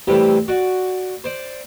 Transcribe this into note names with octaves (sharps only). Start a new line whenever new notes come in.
A2 C3 E3 G3 G4
F#4 D5 F#5
C5 D5